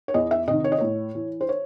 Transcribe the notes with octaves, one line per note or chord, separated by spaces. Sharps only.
C#5
E2 D#5
E5
C3 D#3 D#5
C#5
D#5
A2 C#5
E3
C5
C#5